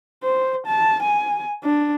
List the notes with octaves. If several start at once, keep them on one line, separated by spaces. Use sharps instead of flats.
C5
A5
G#5
D4